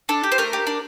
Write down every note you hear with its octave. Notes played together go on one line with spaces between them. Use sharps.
D4 A4
G4
C5
A3 A#4
G4
D4